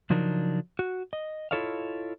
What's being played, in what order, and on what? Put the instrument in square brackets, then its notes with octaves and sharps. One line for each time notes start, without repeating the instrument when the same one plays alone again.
[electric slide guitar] C#3 F3 F#3 D4 D#4 A#4
F#4
D#5
E4 F4 A4 C#5 D#5 F5